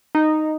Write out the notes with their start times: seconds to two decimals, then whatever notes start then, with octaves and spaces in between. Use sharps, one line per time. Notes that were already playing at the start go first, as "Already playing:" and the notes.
0.15 D#4